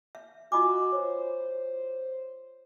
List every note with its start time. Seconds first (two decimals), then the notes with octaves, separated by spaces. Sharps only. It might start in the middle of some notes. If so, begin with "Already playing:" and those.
0.15 E5
0.52 F4 F#4 D#5 G#5 B5 D6
0.93 C5 C#5